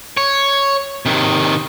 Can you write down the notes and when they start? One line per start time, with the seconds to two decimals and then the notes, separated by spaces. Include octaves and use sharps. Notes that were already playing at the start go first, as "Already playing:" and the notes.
0.17 C#5
1.06 C3 D#3